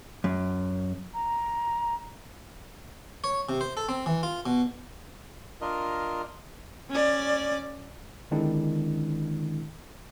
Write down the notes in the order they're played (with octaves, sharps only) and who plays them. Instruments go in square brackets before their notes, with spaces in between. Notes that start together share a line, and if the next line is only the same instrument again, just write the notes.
[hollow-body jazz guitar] F#2
[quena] A#5
[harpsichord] C#5
C3
C5
A4
C4
E3
F4
B2
[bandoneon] D4 F4 A#4 D#5
[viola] C#4 D5
[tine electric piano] D3 D#3 G#3 C4 D4 E4